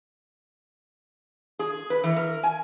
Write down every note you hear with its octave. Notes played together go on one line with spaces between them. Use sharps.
G#4
B4
E3
A#4
G#5